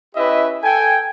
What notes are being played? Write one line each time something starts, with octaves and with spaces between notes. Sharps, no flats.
C#4 E4 G4 B4 D#5 E5
A4 G5 G#5